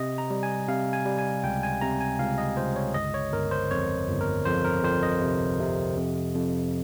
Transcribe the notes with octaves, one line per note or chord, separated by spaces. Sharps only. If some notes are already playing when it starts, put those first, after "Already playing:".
Already playing: C3 D#5
A#5
G3
G#5
C3 F5
G#5
G3
G#5
C#2 G5
G#5
C3 A#5
G#5
C#2 F5
D#5
C#2 C5
C#5
G1 D#5
C#5
G1 A#4
C5
F2 C#5
G1
A#4
F2 C5
A#4
F2 C5
D#5
C3
C3
F2
F2